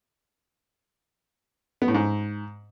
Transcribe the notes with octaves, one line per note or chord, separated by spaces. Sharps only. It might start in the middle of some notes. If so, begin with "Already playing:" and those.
B3
A2
G#2